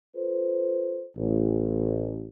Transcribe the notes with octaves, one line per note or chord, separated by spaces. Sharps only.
F4 A4 B4 C5
A1